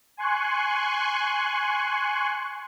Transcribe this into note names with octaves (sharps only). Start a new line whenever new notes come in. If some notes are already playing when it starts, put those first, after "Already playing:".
G#5 C6 C#6 F#6